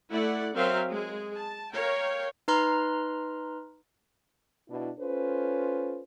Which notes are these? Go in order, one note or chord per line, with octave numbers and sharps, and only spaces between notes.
A3 E4 D5 F#5
F#3 C4 A#4 C5 E5 F5
G#3 G#4
A5
A#4 C#5 F5 G5
D#4 B4 A#5 C6 F6
B2 D4 E4
C#4 F4 A4 B4 C5